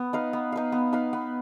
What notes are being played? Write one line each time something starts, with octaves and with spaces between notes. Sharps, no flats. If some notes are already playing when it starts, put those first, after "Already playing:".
Already playing: B3
D#4 B4 F5
B3
D#4 B4 F5
B3
D#4 B4 F5
B3